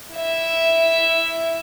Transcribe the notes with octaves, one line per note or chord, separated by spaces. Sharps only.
E4 E5